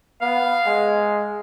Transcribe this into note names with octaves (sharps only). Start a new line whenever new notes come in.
B3 F5
G#3